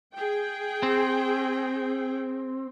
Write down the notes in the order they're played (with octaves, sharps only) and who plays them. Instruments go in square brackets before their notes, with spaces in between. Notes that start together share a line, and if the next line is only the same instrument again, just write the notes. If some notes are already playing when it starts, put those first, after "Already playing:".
[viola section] G#4 G5
[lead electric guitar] C4